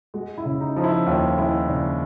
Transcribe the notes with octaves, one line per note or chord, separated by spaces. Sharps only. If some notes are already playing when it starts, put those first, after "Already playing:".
G#3 F#4
E4
C#3
D#4
F3 D#4
E4
D#2 F4
G#3 E4
C#3 D4